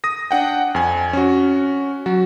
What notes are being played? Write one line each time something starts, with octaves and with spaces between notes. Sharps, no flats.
D#6 A#6
D4 F#5 G5
F2 G#5
C#4 F#4
F#3 F#4